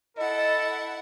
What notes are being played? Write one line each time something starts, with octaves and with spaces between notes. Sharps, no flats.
E4 A4 D#5 F#5